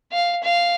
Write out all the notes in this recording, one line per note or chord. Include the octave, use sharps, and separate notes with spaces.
F5
F5